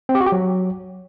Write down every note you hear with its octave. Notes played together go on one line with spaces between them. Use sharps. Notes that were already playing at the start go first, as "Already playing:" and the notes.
C4
G4
F#4
G4
F#3